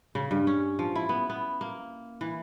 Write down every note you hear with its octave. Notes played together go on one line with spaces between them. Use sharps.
C#3
G2
C#4
F3
E4
B3
B3
A#3
E3